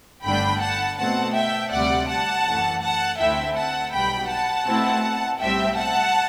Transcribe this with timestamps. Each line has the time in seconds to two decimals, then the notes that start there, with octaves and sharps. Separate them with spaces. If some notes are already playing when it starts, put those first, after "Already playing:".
0.24 G1 G2 D3 A3 D4 G5 B5
0.61 F#5 A5
0.98 B2 A3 C4 F#5 A5
1.34 E5 G5
1.72 D2 C3 G3 D5 F#5
2.08 F#5 A5
2.46 F#2 E3 A3
2.82 F#5 A5
3.19 D2 D3 A3 C4 E4 E5 G5
3.56 F#5 A5
3.93 B1 B2 G3 G5 B5
4.30 F#5 A5
4.67 B2 A3 C4 E4
5.40 B1 A2 G3 C4 E5 G5
5.77 F#5 A5